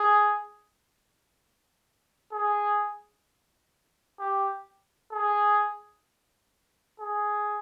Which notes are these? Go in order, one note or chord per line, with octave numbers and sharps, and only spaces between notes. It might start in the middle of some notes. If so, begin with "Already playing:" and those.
Already playing: G#4
G#4
G4
G#4
G#4